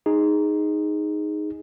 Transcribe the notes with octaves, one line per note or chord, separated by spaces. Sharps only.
D#4 G#4